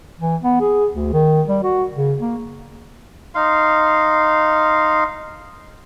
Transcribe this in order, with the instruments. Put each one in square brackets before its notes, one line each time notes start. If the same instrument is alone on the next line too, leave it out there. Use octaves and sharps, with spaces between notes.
[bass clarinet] E3
B3
G#4
D2
D#3
G3
F#4
C#3
A#3
[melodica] D#4 F5 C6